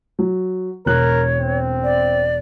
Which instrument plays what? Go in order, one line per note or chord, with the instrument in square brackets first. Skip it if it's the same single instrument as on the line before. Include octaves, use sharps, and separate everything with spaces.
[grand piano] F#3
[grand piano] E1 F#6 [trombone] A#4 [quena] C#5
[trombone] C4
[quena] D5